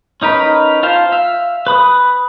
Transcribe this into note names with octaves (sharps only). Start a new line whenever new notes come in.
C#4 D#4 A#4 B4
F4 C5 F5 A5
E5 F5
B4 B5 D#6